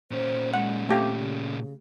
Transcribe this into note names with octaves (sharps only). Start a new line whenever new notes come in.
A#2 C#4 C5
G#3 F#5
A3 C4 G4 F5
C#3